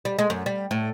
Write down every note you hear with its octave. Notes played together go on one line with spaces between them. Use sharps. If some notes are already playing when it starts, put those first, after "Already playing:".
G3
G#3
F#2
G3
A2